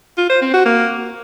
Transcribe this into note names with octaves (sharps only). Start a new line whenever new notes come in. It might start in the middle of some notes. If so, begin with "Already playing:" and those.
F4
C5
C4
F#4
A#3